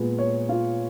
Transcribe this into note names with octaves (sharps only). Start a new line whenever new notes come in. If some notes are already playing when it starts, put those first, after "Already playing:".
Already playing: A#2 G#3 B3
C#5
F4